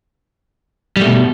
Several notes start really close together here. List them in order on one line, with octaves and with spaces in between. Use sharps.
G3 A3 B2